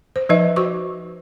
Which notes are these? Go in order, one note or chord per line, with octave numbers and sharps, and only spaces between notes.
C5
F3 D#4 B4 D#5 E5
F#4 C5 C#6 D6